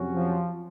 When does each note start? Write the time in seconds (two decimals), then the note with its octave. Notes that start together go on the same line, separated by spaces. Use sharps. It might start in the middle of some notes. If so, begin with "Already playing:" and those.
Already playing: F2 C3 F#3 C#4 F#4
0.15 F3